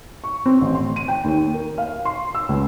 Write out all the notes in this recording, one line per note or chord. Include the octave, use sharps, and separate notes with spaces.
C#6
C4
A1
C6
D#7
G5
D#2
A#4
F5
C6
E6
C#2